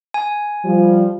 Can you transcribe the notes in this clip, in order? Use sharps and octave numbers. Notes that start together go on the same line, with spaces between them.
G#5
F3 G3